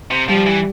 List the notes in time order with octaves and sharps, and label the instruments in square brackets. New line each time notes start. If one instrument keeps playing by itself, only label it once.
[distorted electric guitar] C3
[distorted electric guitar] F3 [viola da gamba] G3
[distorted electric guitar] E3